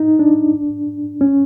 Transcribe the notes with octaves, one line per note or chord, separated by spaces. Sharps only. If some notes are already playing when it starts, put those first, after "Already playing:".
Already playing: D#4
D4
C#4